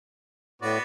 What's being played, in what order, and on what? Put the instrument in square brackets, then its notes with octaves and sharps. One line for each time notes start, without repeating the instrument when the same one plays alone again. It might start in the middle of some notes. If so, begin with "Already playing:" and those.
[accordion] A2 [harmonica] B3 F#4 D5